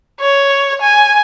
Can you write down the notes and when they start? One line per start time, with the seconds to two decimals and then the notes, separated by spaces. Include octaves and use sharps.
0.20 C#5
0.82 G#5